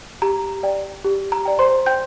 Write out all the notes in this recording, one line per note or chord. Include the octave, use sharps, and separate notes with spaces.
G4 A#5
D5 G5
G4
A#5
D5 G5
C5 C6
C5 G5 G6